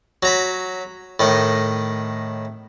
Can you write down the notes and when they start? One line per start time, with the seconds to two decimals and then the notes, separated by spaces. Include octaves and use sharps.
0.23 F#3 A#5 B5
1.20 A2 D#3 D#5